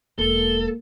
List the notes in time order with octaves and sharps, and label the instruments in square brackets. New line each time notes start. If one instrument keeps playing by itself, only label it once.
[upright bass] E1 [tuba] A#3 [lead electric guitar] A4 [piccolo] G7